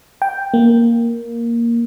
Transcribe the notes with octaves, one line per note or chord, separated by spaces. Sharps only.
G5
A#3